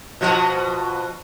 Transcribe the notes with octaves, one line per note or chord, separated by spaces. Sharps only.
B2 F3 F#4